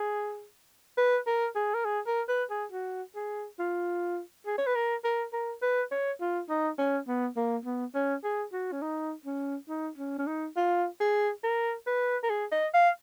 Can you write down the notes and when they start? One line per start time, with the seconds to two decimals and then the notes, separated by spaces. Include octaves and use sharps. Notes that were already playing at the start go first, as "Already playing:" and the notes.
Already playing: G#4
0.97 B4
1.27 A#4
1.55 G#4
1.74 A#4
1.85 G#4
2.06 A#4
2.28 B4
2.50 G#4
2.72 F#4
3.15 G#4
3.59 F4
4.46 G#4
4.58 C#5
4.66 B4
4.75 A#4
5.04 A#4
5.33 A#4
5.62 B4
5.91 C#5
6.20 F4
6.49 D#4
6.78 C#4
7.07 B3
7.36 A#3
7.65 B3
7.94 C#4
8.24 G#4
8.52 F#4
8.72 C#4
8.82 D#4
9.25 C#4
9.69 D#4
9.98 C#4
10.18 C#4
10.27 D#4
10.56 F4
11.00 G#4
11.43 A#4
11.87 B4
12.23 A#4
12.30 G#4
12.52 D#5
12.74 F5